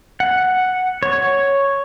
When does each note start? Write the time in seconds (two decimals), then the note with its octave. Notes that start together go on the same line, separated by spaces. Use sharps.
0.20 F#5
1.03 C#5